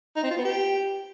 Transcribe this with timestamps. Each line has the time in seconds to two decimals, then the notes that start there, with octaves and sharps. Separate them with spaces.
0.16 D#4
0.23 C4
0.30 F4
0.37 B3
0.45 G4